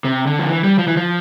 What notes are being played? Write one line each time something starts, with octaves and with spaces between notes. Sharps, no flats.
C3
D3
F3
E3
G3
F3
E3
F3